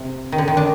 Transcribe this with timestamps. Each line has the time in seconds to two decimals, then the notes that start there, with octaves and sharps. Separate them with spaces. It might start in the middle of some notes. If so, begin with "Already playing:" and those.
Already playing: C3
0.32 D#3
0.38 D3
0.48 D#3
0.57 D4